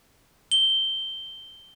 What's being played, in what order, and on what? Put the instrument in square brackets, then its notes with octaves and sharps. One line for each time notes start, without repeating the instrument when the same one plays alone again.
[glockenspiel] G7